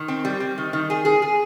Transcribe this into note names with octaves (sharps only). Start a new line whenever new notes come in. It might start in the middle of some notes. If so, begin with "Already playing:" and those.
Already playing: D#3
C4
G3
G3
D#3
D#3
G#4
G#4
G#4